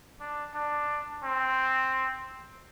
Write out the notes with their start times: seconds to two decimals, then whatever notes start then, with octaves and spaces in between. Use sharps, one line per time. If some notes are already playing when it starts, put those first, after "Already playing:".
0.20 D4
0.54 D4
1.23 C4